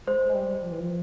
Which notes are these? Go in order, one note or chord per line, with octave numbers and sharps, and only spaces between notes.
G#3 C5
G#3
G3
F3
E3
F3